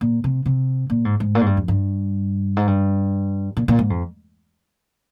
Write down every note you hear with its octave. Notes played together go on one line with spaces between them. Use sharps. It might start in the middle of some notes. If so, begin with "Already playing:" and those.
A#2
C3
C3
A#2
G#2
G#2
A#2
G#2
G2
F2
G2
G#2
G2
A#2
A#2
G#2
F2